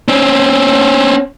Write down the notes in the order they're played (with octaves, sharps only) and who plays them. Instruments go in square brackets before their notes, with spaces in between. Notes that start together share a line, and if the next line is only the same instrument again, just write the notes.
[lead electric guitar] C4 C#4